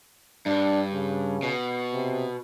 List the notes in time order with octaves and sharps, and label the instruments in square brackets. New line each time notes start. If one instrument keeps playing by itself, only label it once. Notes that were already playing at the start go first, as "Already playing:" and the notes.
[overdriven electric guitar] G2 [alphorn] D4
[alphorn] C#3
[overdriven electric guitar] B2
[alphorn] C3